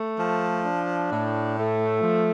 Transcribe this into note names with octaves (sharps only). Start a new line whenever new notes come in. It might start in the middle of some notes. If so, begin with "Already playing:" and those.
Already playing: A3
F3
D4
A2
A3
F3